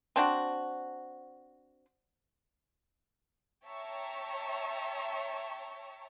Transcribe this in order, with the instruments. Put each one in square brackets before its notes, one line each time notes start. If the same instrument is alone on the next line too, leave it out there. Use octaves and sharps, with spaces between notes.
[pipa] C4 D4 F#4
[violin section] C#5 E5 G5 A5 A#5 C#6